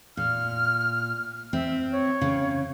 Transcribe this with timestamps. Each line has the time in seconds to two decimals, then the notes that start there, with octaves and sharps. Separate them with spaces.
0.17 A#2 F6
1.53 C4 E5
1.92 C#5
2.21 C#3